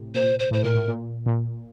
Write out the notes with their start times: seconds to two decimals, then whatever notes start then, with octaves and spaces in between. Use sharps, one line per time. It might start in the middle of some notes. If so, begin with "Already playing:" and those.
Already playing: A2 C3
0.15 A#2 C5
0.39 C5
0.51 A2 C5
0.64 A#2 A#4
0.75 A2
0.88 A#2
1.26 A#2